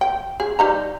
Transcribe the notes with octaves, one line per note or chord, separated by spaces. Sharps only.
G5
G#4
G3 D#4 A#5